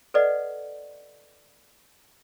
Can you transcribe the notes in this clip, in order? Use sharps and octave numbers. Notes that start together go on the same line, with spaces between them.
A4 B4 D5 D#5 F#5